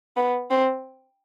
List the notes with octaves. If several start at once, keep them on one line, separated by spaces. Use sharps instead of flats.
B3
C4